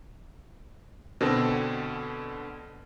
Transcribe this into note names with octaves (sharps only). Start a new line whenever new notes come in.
B2 D3 C4 A4